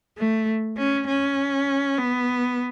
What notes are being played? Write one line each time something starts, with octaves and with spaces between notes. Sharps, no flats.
A3
C#4
C#4
B3